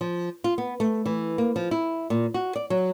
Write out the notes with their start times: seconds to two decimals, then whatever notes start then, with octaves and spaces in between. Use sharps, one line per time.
0.01 F3
0.44 F4
0.58 B3
0.80 A3
1.06 E3
1.38 A#3
1.56 F3
1.71 E4
2.10 A#2
2.34 F#4
2.56 D5
2.70 F#3